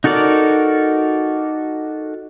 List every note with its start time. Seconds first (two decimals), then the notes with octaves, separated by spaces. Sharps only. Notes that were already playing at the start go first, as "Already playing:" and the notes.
0.04 D#4 F#4 A4 A#4 D5